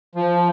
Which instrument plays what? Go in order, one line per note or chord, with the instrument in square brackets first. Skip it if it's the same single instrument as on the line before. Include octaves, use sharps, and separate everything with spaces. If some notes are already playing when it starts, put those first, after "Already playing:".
[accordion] F3